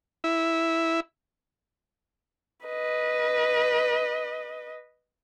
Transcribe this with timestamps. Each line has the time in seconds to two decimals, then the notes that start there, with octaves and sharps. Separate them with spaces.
0.24 E4
2.66 B4 D#5